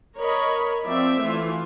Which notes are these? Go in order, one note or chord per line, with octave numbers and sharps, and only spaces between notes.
A#4 C#5 D#5 B5
F3 C4 D5 E5
E3 A3 F4